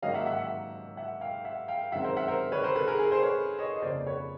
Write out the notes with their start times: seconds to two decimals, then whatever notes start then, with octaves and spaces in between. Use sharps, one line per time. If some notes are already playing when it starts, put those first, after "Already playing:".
0.02 G#2 D#3 F#3 A#3 C#4 D#5 F5
0.14 E5 F#5
0.26 E5 F#5
0.38 E5 F#5
0.97 E5 F#5
1.21 F5 G5
1.45 E5 F#5
1.68 F5 G5
1.92 F#2 D#3 G#3 C4 E5 F#5
2.04 A#4 C5
2.17 E5 F#5
2.28 A#4 C5
2.52 B4 C#5
2.63 A#4 C5
2.76 A4 B4
2.87 G#4 A#4
2.99 G#4 A#4
3.11 A#4 C5
3.23 B4 C#5
3.59 C#5 D#5
3.76 D#5
3.82 F2 C#3 F3 A#3 C5 D5
4.07 B4 C#5